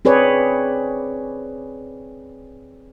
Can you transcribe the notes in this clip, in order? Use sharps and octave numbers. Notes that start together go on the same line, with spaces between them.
C4 G#4 B4 C#5 D5